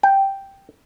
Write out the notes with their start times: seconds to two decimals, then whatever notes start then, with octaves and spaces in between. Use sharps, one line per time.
0.03 G5